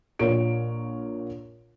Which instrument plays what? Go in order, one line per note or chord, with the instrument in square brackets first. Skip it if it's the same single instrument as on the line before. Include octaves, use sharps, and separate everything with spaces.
[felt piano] A#1 F4 A#4 C#5 D7